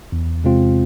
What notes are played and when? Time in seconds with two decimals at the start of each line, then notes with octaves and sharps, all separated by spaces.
0.12 E2
0.44 C3 G#3 C4 F4